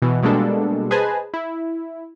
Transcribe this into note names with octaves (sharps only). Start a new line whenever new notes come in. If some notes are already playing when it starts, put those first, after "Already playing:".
B2 E3
B2 G3 G#3 A#3 D4 A4
G#4 B4 C5 D#5 G#5 A5
E4